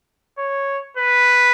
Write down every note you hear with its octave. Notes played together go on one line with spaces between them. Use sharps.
C#5
B4